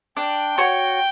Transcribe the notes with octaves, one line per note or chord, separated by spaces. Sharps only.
D4 G5
F#4 C#5